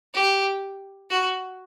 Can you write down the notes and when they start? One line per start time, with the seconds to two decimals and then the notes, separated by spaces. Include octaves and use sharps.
0.14 G4
1.10 F#4